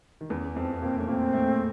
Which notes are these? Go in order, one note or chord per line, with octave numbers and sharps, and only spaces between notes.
D#3
E2 E3 C#4
F2 F3 C4
B3
A#2 A#3 C4
A3 C#4
A#2 A#3 C4
A2 A3